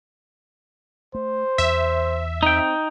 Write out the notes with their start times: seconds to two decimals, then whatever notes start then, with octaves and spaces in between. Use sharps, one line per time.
1.15 A3 C5
1.58 E2 E5
2.43 C4 D#4 G5